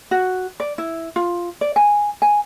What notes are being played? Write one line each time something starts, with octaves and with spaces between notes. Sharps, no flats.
F#4
D5
E4
F4
D5
G#5
G#5